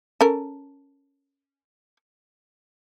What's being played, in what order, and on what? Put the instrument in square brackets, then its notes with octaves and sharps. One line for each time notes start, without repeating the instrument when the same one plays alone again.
[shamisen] C#4 A4 A#4